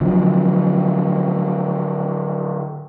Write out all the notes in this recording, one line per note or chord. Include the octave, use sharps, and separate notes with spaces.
D3 F3 F#3